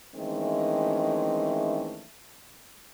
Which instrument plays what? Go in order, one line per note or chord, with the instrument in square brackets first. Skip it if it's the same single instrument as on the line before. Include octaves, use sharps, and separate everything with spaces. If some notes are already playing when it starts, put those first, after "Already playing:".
[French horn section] D#3 E3 G#3 A3 C4 C#4